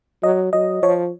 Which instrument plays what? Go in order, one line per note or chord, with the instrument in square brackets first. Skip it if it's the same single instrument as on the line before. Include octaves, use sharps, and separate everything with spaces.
[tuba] F#3 [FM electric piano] D#5
[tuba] F#3 [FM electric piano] D#5
[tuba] F3 [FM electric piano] C#5